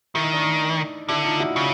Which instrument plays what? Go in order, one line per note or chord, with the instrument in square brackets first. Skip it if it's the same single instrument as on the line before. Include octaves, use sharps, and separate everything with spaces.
[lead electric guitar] D#3 [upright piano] E4
[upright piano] D#4
D4
D#4
[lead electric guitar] D3 [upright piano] D4 E4
[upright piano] D#4 F4
E4 F#4
[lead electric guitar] C#3